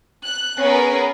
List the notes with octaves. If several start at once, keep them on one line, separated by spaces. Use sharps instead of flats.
F#6
B3 C#4 G#4 A#4 B4